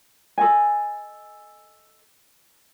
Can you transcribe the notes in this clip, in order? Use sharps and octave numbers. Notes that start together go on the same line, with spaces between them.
A4 D#5 G#5